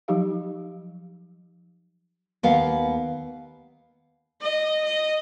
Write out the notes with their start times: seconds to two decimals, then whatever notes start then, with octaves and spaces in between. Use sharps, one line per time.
0.08 F3 F#3 D#4 G4 F5
2.43 D#2 B3 F5
4.41 D#5
4.84 D#5